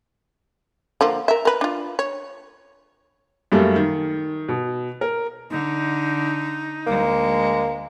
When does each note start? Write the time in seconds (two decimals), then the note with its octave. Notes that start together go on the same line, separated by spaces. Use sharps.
1.01 D3 F3 A#3
1.28 A#4 E5
1.45 A#4 B4
1.61 D4 F4
1.99 C#5
3.52 F#2 G3 A3 A#3
3.76 D#3
4.48 B2
5.01 A#4
5.50 D3 D#4
6.87 D2 G#3 A#3